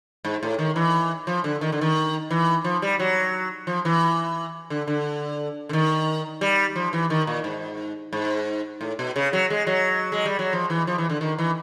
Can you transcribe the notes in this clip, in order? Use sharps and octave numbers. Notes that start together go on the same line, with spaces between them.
G#2
A2
D#3
E3
F3
D3
D#3
D3
D#3
E3
F3
G3
F#3
F3
E3
D3
D3
D3
D#3
G3
F3
E3
D#3
A#2
G#2
G#2
A2
B2
C#3
F#3
G#3
F#3
G#3
G3
F#3
F3
E3
F3
E3
D3
D#3
E3